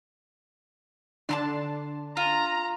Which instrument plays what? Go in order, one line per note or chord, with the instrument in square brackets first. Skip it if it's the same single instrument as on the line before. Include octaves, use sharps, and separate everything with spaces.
[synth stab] D3 D4 [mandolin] A5 A#5 C6
[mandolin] F4 [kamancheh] A#5